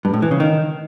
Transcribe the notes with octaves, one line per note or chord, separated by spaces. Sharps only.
G2
A2
E3
C#3
D#3